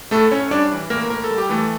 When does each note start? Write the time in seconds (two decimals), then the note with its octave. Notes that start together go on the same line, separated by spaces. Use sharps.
0.11 A2 A3 A4
0.31 A2 C#4 C#5
0.51 G3 D4 D5
0.71 E3
0.90 A2 A#3 A#4
1.10 A2 A#4
1.24 A4
1.30 G3
1.38 G4
1.49 E3 A3 A4